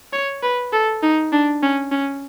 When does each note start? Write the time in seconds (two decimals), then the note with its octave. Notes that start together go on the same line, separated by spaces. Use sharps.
0.13 C#5
0.43 B4
0.73 A4
1.03 D#4
1.32 D4
1.63 C#4
1.91 C#4